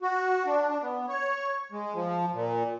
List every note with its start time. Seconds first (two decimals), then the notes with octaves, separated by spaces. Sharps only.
0.02 F#4
0.46 D4
0.69 D4
0.83 B3
1.09 C#5
1.72 G#3
1.95 F3
2.34 A#2